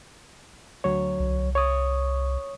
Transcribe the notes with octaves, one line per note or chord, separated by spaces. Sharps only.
D2 F#3 C#5
C2
C#5 C#6 D#6